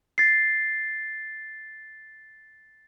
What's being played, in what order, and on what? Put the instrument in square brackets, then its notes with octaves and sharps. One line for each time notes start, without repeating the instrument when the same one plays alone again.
[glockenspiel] A6 C7